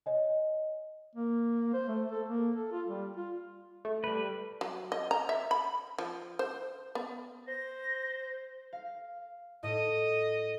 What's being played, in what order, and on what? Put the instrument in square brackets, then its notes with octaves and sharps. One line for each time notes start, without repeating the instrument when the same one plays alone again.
[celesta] C#5 D#5 G#5
[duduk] A#3
C5
A3
A4
A#3
A4
F4
G3
F4
[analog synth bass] A3
[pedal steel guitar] G3 B4
[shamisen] F#3
D#5
A#5
E5
B5
F3
C5
B3
[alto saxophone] C5 [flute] A#6
[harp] F5
[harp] A2 [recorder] D#5